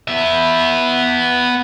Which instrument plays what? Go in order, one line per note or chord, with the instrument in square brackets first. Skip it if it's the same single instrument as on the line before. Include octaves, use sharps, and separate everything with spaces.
[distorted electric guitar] B3 E5